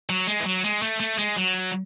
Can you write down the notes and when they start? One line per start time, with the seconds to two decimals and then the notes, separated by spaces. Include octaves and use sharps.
0.09 F#3
0.27 G#3
0.40 E3
0.46 F#3
0.64 G#3
0.82 A3
1.00 A3
1.19 G#3
1.36 F#3